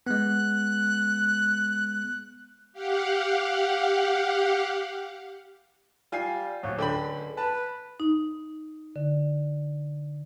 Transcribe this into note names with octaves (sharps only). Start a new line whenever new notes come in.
G#3 B3 F#6
G4 F5 F#5
G3 F4 G#5 C7
D1 F#3
C#2 D3 G5 B5
B4 A5
D#4
D3